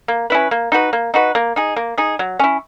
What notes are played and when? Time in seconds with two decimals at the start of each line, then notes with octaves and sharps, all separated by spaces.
0.08 A#3
0.30 C#4 E4 B4
0.51 A#3
0.72 D#4 F#4 B4
0.93 A#3
1.14 D#4 F#4 B4
1.35 A#3
1.56 D#4 G#4
1.76 A#3
1.98 D#4 G#4
2.19 F#3
2.39 C#4 E4